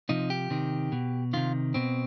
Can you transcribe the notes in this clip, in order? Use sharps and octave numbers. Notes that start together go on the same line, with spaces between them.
C3 F3 D#4
G4
C3 D#3
B2
C3 D#3 F4
B2 C4